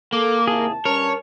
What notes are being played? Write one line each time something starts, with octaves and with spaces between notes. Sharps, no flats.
A#3 A4 D6
D#2 C3 E4 G#4 A5
G2 C#4 A#4 C#5